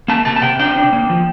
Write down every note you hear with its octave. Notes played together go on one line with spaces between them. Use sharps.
A#3 A5
C3 A5
A5
C3 G5
D4 G5
D4
A#3
F3